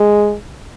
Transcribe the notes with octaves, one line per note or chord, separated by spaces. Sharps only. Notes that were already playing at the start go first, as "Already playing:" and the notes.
Already playing: G#3